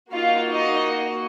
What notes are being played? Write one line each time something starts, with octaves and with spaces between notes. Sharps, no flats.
A#3 D#4 F4 F#4 F5
D#4 D#5